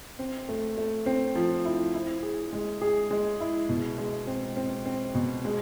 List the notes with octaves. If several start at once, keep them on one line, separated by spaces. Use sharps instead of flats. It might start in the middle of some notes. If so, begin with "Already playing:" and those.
C4
A3
A3
C4
F3
E4
E4
G#4
G#3
G#4
G#3
E4
B2
G#3
C4
C4
C4
B2
G#3